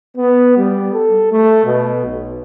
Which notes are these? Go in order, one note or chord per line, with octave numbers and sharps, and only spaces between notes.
B3
G3
A4
A3
B2
B1